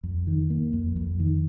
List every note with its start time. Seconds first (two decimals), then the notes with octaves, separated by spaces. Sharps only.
0.03 F2
0.27 D#3
0.50 A#3
0.73 F2
0.96 F2
1.20 D#3